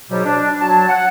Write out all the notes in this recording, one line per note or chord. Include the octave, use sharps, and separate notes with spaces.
G#2 B2 F#3 G3
D4
F#3 A5
F#5